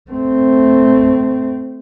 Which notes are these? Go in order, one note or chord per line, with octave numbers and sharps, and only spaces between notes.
A3 C4